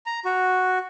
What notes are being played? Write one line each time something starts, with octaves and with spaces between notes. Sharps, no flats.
A#5
F#4